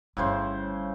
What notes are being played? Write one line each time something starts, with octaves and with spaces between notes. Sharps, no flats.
G1 A2 C#3 G3 C5